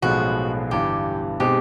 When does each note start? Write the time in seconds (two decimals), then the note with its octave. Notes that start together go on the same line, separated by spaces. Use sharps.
0.02 B1 A2 F3 G#3 B3 F#4
0.71 G1 G2 E3 G4
1.40 B2 G#3 C4 D#4 G4